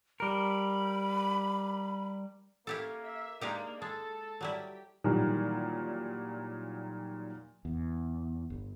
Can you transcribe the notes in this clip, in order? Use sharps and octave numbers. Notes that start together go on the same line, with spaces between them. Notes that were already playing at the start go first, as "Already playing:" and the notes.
G3 A#4 B5
A#3 C#4 E4 G4 A4
E5
G#3 A#3 D4 D#4 G4
G#3 A4 A5
F#3 G3 E4 G4
A#2 D#3 E3 F#3 G3 A#3
E2
G1